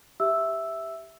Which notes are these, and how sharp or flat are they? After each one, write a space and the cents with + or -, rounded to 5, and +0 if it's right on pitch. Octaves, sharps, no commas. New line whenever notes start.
G4 +0 E5 +0 E6 +0